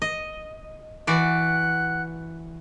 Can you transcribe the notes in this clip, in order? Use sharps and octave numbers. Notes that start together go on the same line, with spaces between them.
D#5
E3 F#4 D5 F#5 F#6